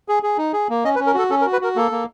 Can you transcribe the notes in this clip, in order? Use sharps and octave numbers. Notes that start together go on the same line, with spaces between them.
G#4
G#4
D#4
G#4
A#3
C#4 D#5
B4
C#4
A#4
F#4 A4
C#4 A4
A#4
F#4
B4
F#4 A#4
A#3 A4
A#3